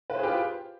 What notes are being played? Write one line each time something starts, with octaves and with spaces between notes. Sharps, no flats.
F4 G4 G#4 B4 C5